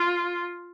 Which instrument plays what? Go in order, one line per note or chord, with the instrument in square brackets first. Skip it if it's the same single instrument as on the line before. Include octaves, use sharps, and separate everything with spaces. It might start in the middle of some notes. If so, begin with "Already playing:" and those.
Already playing: [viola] F4